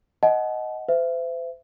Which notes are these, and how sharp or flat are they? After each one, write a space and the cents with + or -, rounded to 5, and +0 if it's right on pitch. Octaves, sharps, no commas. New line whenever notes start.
D#5 +5 F#5 +0 A5 -40
C5 -40 E5 +30